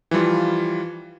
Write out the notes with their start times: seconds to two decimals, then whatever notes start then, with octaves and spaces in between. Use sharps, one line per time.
0.11 E3 F3 G3 F4